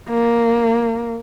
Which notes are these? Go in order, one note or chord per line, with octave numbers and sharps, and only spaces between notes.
A#3